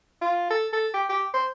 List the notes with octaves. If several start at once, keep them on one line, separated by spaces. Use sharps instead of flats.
F4
A4
A4
G4
G4
C5